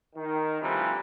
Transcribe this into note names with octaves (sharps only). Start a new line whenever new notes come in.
D#3
D2 C3 E3 F3 G3